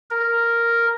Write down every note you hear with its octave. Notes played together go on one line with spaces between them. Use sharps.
A#4